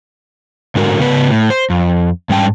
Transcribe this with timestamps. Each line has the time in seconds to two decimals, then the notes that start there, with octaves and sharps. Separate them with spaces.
0.75 G#2 D3 F#4 A#4
0.99 C#3 B3 B4
1.31 A2
1.50 C5
1.70 F2
2.29 G#2 G3 C#4 G5 A5